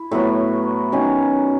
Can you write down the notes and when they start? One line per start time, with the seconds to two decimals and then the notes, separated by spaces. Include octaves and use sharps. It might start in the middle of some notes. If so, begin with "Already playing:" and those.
Already playing: E4
0.11 A2 F#3 B3 F#4
0.92 D#3 F#3 C#4